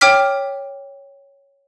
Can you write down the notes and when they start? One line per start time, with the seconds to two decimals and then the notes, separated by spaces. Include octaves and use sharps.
0.01 C#5 G5 D6 F6 B6